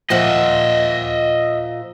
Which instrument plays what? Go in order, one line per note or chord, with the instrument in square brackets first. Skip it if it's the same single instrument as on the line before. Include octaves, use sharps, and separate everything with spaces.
[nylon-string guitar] A#2 F3 F#5 [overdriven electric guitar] D#5 E5